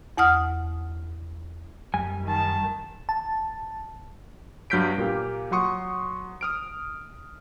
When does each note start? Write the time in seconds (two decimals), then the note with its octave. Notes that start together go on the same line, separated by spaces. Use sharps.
0.17 E2 F#5 D#6 F6
1.94 F#2 G3 G#5
2.26 D#3 A5
3.09 A5
4.70 G2 F#3 F6 G6 B6 D7
4.98 A#2 A#3 G4
5.51 F#3 F#5 C6 C#6 D#6 C#7
6.41 D#6 F6 D7